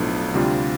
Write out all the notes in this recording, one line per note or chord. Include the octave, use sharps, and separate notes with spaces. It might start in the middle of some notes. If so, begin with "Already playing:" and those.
Already playing: B1 A2 F3 B3 D4
D2 C3 G3 D4 F4